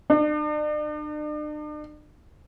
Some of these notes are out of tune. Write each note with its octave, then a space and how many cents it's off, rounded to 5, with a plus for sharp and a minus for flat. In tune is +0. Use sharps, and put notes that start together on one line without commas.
D4 +40